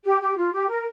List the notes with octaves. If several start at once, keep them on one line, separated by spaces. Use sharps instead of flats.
G4
G4
F4
G4
A#4